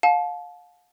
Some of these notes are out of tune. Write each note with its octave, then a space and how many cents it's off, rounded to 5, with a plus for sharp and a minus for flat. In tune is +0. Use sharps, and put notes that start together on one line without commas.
F5 +35 A5 -30